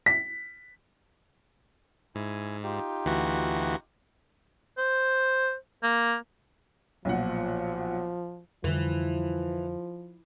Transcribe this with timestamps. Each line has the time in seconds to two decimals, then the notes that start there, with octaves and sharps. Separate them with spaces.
0.06 B6
2.15 G#2 E4 G#5
2.63 D#4 F4 G4
3.05 D2 E3 F#4
4.78 C5
5.83 A#3
7.05 B1 A#2 F3 F#5
8.64 F2 D3 E3 F3 G3